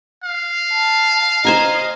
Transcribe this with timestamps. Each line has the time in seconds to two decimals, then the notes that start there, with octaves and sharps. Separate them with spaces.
0.24 F5
0.74 A5
1.45 C5 D#5 G#5 A#5